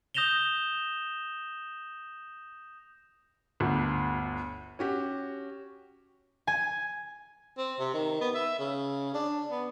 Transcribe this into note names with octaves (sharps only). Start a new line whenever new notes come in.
D#6 G6 A#6 E7 F7 G7
G1 D2
C#4 F#4 G4
G#5
C4
C3
D#3
B3
E5
C#3
D4
B3